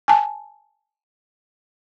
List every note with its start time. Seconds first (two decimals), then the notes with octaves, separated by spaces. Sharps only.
0.08 G#5 A5